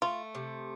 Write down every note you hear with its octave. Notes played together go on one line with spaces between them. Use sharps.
A3 F4
C3